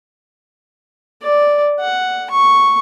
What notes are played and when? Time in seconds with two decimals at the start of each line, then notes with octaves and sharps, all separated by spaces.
1.23 D5
1.80 F#5
2.30 C#6